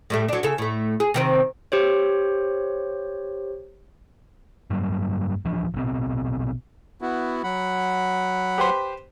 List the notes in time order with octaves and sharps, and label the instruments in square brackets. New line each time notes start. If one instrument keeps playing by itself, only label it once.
[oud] A2 G3 A3
F#3 D4
C#3 A4
A2 A3
G#4
C3 D#3 C4
[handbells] G4 C5 C#5
[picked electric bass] G2 F#3 G3 A#3
D1 E3 F3 D4
A#1 B2 C4
[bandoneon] B3 E4 F#4
F#3 F#5 B5
[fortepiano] G4 B4 C5